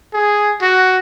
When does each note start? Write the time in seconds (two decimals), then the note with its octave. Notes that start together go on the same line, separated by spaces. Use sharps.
0.13 G#4
0.62 F#4